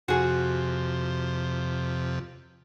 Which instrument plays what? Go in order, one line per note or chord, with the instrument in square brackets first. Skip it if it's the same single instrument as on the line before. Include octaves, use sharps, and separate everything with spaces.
[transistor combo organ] F2 C3 [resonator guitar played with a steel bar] F#4 G#4